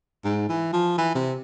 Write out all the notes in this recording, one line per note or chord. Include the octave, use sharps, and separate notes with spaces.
G#2
E3
F3
E3
C3